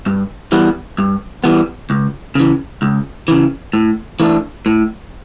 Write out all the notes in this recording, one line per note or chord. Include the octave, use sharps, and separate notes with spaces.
G2
E3 G3 B3
G2
E3 G3 B3
C#2
C#3 E3
C#2
C#3 E3
A2
E3 A3 D4
A2